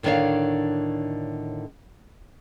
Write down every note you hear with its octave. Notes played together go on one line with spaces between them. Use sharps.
A2 D3 D#3 D4 C#5 F5